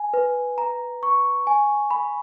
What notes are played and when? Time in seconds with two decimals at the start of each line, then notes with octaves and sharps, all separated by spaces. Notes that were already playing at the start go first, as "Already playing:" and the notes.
Already playing: G#5
0.14 B4
0.58 A#5
1.03 C#6
1.47 G#5
1.91 B5